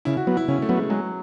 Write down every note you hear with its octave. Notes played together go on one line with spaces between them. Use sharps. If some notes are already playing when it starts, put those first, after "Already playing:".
C#3 E4
F#4
F#3 B3
E4
C#3 C#4
A3
F#3 B3
G#3
F#3 G#3